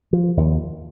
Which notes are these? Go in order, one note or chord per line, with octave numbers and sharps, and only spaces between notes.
F3
D#2